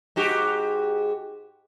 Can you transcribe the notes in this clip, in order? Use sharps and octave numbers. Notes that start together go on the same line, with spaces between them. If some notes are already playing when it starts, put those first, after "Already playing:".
G#2 F#4 G4